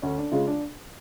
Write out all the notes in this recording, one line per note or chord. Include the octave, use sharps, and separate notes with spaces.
D2 C#4
D4
C#3 G#3 F4
D4